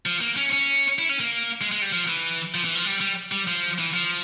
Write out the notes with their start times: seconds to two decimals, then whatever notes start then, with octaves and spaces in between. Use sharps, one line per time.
0.06 F3
0.21 A#3
0.37 C#4
0.52 C#4
0.99 E4
1.09 C#4
1.20 A#3
1.61 G#3
1.71 G#3
1.82 G3
1.92 F3
2.07 E3
2.54 F3
2.65 E3
2.75 F3
2.85 G3
3.00 G3
3.32 G3
3.47 F3
3.78 E3
3.94 F3